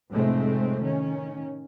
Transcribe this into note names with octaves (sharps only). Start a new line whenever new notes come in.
F1 A2 G#3 A3 C4
D#3 C#4